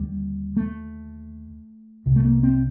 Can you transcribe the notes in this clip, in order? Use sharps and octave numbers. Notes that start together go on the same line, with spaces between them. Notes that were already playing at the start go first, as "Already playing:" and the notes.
Already playing: D#2 D3 G3
A3
C2 C3
A3
A#3
C4